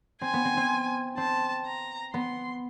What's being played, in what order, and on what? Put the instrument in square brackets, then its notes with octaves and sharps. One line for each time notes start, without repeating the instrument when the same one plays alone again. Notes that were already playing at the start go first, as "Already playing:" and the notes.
[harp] C4 [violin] G#5
[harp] B3
C4
C4
[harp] C4 [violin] A5
[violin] A#5
[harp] B3 [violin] C6